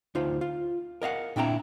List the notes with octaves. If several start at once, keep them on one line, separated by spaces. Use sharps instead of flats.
D2 D#4 F4 C5
F4
A#4 D#5 F5 F#5
A#2 C4 D4 E4 G5 A#5